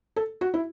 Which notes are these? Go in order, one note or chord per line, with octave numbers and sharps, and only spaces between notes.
A4
F#4
E4